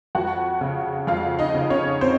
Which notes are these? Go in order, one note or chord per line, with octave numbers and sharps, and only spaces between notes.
F2 F#4 F#5
C#3
F2 F4 F5
D#4 D#5
C#3
C#4 C#5
C4 C5